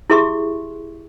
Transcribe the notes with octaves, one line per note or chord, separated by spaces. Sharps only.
E4 G4 G#4 E5 C6 C#6